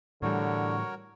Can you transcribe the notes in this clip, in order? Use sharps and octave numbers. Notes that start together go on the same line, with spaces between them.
A2 D3 E3 G3 F#4 A#4 C#5